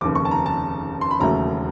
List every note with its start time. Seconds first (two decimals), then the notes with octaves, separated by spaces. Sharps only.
0.01 F1 D#2 C#3 D6
0.15 C#6
0.25 A5
0.31 A#5
0.46 A5
1.01 C6
1.11 B5
1.20 E1 D#2 C#3 F#3 A3 A#5